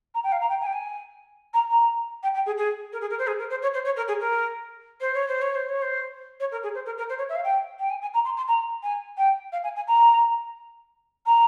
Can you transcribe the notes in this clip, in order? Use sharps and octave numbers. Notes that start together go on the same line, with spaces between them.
A#5
G5
F5
A#5
G5
G#5
G5
G#5
A#5
A#5
G5
G5
G#4
G#4
A#4
G#4
A#4
C5
G#4
A#4
C5
C#5
C5
C#5
A#4
G#4
A#4
C5
C#5
C5
C#5
C5
C#5
C5
C#5
A#4
G#4
C5
A#4
A#4
C5
C#5
E5
F5
G5
G5
G#5
G#5
A#5
C6
C6
A#5
G#5
G5
F5
G#5
G#5
A#5
A#5